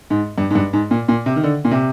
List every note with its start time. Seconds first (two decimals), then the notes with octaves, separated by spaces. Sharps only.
0.10 G#2
0.38 G2
0.50 G#2
0.55 G2
0.73 G#2
0.91 A#2
1.08 A#2
1.26 C3
1.36 D#3
1.43 D3
1.65 A#2
1.71 C3